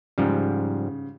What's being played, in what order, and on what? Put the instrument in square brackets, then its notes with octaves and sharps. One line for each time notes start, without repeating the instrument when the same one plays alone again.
[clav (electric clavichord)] G#2 F3 G3 [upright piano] C#3